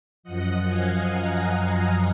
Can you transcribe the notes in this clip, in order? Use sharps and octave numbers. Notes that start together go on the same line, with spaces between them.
F#2 F3 D#5 F#5
F5 G#5
F#5 A#5